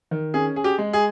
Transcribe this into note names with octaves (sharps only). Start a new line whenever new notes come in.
D#3
C#4 G#4
G#4
G4
G#3
G#4